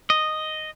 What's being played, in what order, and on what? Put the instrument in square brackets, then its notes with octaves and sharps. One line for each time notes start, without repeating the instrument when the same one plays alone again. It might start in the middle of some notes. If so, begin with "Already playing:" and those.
[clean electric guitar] D#5